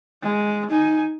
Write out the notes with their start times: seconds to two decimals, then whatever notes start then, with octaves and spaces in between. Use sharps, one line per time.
0.23 G#3
0.70 D#4 G#5